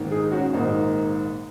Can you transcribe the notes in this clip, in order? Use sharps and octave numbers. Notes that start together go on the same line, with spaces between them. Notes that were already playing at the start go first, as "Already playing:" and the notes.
Already playing: A#1 G#2 D#3
D#4 G#4
C#4 F#4
A#1 G#2 D#3 A#3 D#4